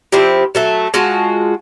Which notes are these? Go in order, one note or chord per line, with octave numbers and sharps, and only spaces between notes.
F3 C4 E4 G4
F#3 A3 E5
G#3 F4 F#4 A5